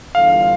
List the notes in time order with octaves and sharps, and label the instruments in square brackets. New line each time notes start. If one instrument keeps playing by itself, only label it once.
[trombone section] E2 D3 G3 D4 F4 [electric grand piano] F5